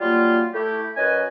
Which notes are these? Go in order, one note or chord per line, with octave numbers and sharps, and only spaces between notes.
F#3 G3 A#3 F4
A3 E4 G4
F#2 C#4 B4 D#5 G#5